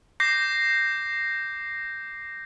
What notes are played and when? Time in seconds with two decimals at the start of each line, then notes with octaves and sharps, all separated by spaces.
0.20 D6 G6 A#6 C7